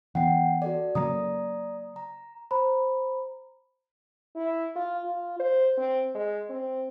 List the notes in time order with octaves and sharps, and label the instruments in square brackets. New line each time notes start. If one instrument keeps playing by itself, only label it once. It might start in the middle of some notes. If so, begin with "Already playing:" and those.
[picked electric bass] E3 B3 [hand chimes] F#5 G5 C7
[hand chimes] F#4 A4 D5
[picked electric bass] C#3 F#3 A#3 [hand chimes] D5 A#5 D#6
[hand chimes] A#5
[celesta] C5 A#5 B5
[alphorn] E4
F4
F4
C5
C4
G#3
C4